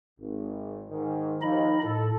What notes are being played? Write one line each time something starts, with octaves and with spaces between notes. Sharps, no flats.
G#1
G#2 D#3
D#2 F3 D#4 D#5 B5
A2 A4